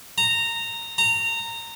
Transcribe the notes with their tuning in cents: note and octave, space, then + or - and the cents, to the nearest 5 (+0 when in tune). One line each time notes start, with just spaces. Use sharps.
A#5 -15
A#5 -20